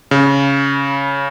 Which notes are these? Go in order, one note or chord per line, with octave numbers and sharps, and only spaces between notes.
C#3